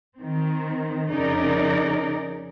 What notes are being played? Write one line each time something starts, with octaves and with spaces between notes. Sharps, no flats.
D#3 C4
F2 C#3 D#4 A#4 D5